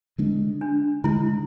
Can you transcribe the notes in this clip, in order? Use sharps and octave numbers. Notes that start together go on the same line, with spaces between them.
D3 G#3 D4
D4
D3 G#3 D4 E4